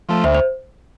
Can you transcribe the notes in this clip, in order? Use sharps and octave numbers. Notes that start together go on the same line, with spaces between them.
F3 A3
D2 C5 E5
C5